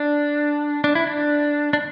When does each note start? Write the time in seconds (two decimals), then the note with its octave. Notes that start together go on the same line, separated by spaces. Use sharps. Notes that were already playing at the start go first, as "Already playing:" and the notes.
Already playing: D4
0.84 D4
0.95 E4
1.07 D4
1.73 D4